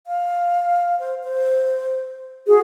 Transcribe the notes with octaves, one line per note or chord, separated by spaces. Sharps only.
F5
C5
C5
F#4 G#4